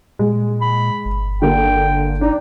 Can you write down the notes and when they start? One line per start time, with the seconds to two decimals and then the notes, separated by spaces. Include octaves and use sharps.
0.19 A#2 G#3
0.61 B5
1.05 G1
1.42 D3 A#3 G5
2.21 D4 D#4